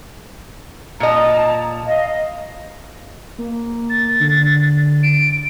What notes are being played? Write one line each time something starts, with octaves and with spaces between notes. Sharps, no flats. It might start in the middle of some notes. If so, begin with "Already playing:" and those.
A#2 D#5 A5 A#5
D#5 F5
A#3
A6
D3
D7